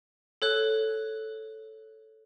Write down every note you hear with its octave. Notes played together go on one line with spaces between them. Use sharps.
A4 C#5 F#6